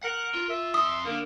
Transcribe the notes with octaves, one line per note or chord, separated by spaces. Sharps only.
A#4 F#5
F4
E5
F2 C6 D#6
D3 A#3